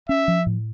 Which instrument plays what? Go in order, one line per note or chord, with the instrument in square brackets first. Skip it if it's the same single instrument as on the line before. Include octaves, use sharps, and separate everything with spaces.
[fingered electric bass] C#4 [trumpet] E5
[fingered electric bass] F3
A2